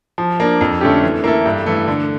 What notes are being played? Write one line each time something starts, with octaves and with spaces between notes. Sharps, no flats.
F3
A#3 D4
F2
D3 A3 C#4 G4
E3
A#3 E4 A4
G2
E3 A3
D3